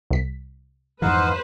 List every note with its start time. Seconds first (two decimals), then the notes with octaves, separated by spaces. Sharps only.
0.11 C2 B6
1.02 F2 G#2 E3 D#4 B4 C5 F5 F#5